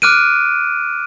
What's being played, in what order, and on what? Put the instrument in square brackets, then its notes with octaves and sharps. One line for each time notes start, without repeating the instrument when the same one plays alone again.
[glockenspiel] D6 F6 F#6 D7 D#7